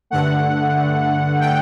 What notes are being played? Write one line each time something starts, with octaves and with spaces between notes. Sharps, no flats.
G2 D3 A3 F#5
G2 D3 A3
D3 A3 G5